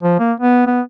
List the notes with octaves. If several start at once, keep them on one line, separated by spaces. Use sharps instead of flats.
F3
A#3
B3
B3